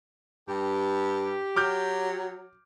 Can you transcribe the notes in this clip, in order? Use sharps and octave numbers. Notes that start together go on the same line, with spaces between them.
G2 G4
F#3 D6 F6 G6